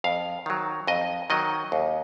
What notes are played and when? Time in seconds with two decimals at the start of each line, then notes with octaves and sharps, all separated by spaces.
0.04 F2 F5
0.46 D#3 F#3
0.87 F2 D#5
1.30 D#3 F#3 D#5
1.72 D#2